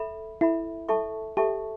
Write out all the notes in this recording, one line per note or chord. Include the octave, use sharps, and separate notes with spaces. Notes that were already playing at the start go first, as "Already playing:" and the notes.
Already playing: A4 E5 B5
E4 A4 E5 B5
A4 E5 A5 C#6
G4 A4 E5 A5 C#6